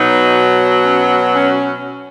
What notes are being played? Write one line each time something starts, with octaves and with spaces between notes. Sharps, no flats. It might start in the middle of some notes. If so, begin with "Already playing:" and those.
Already playing: B2 F#3 D#4
C#4
C#4